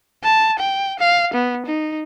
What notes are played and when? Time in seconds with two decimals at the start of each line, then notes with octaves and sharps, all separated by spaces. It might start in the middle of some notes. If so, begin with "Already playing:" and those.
0.23 A5
0.59 G5
0.99 F5
1.34 B3
1.66 D#4